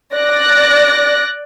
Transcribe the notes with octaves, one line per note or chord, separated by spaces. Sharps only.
D5 F#6 A#6